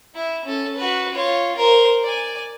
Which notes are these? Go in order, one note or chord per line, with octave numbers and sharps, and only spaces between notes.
E4
C#4 A4
F#4 B4
F4 C#5
A#4 C5
D5 G#5